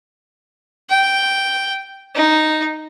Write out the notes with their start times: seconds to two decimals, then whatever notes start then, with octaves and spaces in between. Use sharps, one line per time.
0.90 G5
2.15 D#4